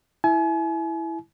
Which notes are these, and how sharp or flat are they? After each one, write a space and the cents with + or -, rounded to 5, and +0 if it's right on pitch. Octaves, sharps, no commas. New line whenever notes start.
E4 +0 G#5 +40